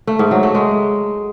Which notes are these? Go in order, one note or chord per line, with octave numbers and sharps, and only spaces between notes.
A3
G#2
F#3
A3
G#3